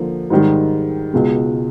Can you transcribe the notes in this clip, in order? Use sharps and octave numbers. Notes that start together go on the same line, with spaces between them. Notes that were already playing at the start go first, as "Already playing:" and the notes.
Already playing: D3 F3 A#3
G#2 D#3 G3
C#2 B2 G#3